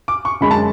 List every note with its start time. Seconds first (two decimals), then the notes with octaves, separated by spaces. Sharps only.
0.08 D6
0.25 C#6
0.41 F#2 D3 G#3 D4 B5
0.51 A5